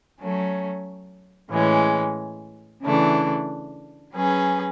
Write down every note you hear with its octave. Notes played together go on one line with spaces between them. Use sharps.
F#3 A3 C#4
A2 E3 G#3 C#4
C#3 E3 A3 D4
F#3 C#4 G#4 B4